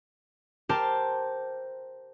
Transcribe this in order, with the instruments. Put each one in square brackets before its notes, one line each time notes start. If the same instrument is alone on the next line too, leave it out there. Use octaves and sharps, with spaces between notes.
[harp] G4 A#4 C5 A5